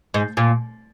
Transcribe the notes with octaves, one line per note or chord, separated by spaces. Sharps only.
G#2
A#2